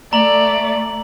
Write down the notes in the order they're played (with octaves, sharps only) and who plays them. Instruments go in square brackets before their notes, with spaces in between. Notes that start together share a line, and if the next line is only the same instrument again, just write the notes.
[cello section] A3 [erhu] D5 [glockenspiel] A#5 F#7